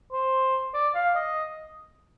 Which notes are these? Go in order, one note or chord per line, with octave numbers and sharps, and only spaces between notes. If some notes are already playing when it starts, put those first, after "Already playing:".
C5
D5
F5
D#5